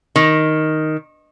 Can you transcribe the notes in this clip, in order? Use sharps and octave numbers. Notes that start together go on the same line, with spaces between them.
D#3